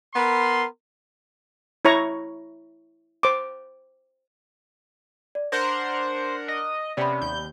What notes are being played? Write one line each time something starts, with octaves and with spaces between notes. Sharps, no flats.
B3 A#4 B5 C6
E4 C#5 A#5 C#6
C5 D6
D5
D4 A#4 C5 F#5 A#6
D#5
C3 B3 C#4 D5 B5
D#2 G6